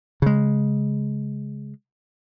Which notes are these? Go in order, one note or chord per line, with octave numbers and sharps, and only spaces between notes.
C#3 G#3